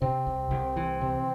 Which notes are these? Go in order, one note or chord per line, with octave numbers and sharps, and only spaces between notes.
C3 C4
C2
C2
E3
C3